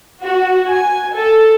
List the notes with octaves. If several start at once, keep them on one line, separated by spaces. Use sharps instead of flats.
F#4
G#5
A4